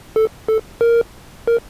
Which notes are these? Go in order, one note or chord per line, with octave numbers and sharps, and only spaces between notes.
A4
A4
A#4
A#4